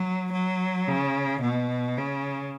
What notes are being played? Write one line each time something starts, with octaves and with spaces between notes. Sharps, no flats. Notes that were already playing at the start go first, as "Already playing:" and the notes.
Already playing: F#3
F#3
C#3
B2
C#3